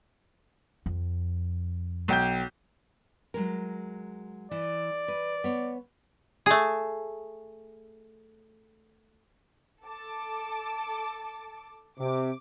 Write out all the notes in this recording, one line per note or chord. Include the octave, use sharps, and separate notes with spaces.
F2
B1 G5 G6
F#3 G#3 A#4
E3 D5
B4
B3 C#5
A3 G#4
A4 A5 D6
C3 D6